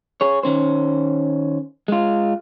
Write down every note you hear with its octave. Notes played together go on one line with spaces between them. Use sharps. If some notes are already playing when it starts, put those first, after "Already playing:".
G#4 C#5
D#3 C#4 C5
G#3 F4